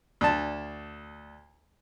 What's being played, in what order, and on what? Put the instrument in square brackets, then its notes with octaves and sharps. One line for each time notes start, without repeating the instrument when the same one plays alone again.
[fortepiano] D2 A5